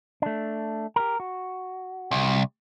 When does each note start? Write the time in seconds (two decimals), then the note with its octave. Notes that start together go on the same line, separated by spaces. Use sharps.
0.22 A3 D4
0.96 G4 A#4
1.20 F#4
2.11 C2